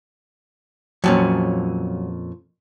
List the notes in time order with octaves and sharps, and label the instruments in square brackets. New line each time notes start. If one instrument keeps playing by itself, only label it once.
[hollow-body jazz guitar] F2 A#2 C#4 [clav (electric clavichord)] F#3 G5 A5